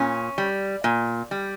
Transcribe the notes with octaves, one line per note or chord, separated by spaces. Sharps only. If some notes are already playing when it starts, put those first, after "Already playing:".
Already playing: A#2 C#4
G3
A#2
G3